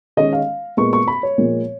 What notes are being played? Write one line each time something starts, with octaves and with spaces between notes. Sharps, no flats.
D#3 G#3 C#4 D#5
F5
A#2 G#3 B3 C#6
C#6
B5
C#5
A#2 F3 G#3